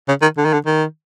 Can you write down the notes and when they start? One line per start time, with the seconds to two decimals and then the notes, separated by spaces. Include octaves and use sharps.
0.09 C#3
0.22 D#3
0.38 D3
0.45 D#3
0.53 D3
0.66 D#3